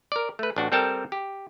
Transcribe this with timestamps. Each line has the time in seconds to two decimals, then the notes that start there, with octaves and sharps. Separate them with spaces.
0.12 A#4 D5
0.39 A3 B4
0.56 A1 D4 F#4
0.72 G3 C4 A4 A#4 G5 A5
1.12 G4